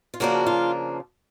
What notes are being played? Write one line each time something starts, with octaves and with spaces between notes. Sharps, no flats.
F4
C#3 F3 A#3 D4 F#4
F4